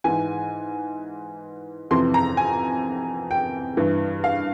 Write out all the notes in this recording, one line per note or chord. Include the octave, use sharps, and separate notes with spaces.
G#2 E3 G#5
F2 C3 E3 C6
A#5
G#5
G5
G2 E3
F5